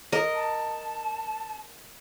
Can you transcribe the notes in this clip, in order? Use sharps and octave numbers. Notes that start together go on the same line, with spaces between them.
A#4 D#5
A5